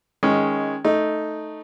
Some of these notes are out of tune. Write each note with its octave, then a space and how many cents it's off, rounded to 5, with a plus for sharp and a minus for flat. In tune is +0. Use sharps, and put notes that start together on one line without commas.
D#3 +10 G#3 +0 C#4 +0
A3 +0 D#4 +0